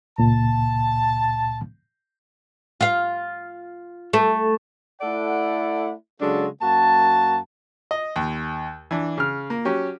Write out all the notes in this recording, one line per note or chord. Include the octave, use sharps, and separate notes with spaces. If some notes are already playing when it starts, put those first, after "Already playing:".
C#2 A#2 A5
F4 F5
A3
A3 E4 A4 D5 F#5
C#3 F#3 G#3 D4 F#4 A4
F#2 A#3 F#4 A5
D#5
D#2
E3 D4
C#3 F6
A#3
F#3 C#4 G4